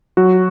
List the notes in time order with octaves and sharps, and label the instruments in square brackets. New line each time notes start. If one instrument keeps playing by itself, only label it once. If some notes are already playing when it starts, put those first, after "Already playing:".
[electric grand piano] F#3 F#4